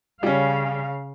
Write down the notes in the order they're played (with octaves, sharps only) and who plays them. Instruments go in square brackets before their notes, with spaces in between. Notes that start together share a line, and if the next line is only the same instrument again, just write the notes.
[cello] C#3 F5 [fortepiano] G3 C#4